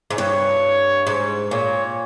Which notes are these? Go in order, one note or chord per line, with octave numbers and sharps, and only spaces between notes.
G#2
G2 C#5
G#2
A#2 C#5